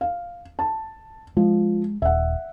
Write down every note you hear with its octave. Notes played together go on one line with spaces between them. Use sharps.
F5
A5
F3 G#3
D#1 E5 F#5